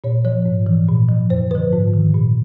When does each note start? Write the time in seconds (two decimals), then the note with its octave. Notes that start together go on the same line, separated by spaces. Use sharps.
0.04 A#2 C#5
0.25 F3 C#5
0.46 G#2
0.66 E3
0.88 A#2
1.09 F3
1.30 F#2 C5
1.51 D3 F3 B4
1.73 G#2
1.94 D#3
2.14 A#2